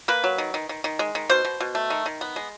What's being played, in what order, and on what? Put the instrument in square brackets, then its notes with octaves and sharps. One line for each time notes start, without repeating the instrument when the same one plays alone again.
[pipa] A#3 B4
F#3
D#3
D#3
D#3
D#3
G#3
D#3
B2 C5
B2
B2
A3
D#3
D#3
B3
G#3